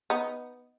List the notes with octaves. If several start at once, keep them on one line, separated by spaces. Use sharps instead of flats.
B3 D#4